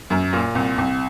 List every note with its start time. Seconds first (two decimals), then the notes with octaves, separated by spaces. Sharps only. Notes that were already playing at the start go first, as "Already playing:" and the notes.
0.10 F#2
0.33 A#2
0.55 C2
0.78 C2